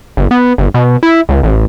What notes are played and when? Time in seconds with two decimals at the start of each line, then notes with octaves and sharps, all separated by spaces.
0.17 G1
0.31 B3
0.58 G1
0.74 B2
1.03 E4
1.29 C#2
1.43 A1